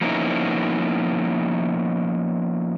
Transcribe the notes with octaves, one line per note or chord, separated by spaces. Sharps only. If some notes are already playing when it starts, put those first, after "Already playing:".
F3 A#3 B3 C#4 D#4 E4